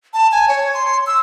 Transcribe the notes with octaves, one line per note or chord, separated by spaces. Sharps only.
A5
G#5
C#5
C6
E6